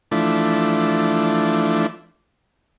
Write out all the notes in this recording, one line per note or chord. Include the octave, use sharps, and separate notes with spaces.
E3 F3 A3 D4